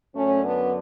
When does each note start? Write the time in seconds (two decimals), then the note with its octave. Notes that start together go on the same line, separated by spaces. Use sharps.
0.14 F#2 D3 F#3 A3 C#4
0.45 B3 D4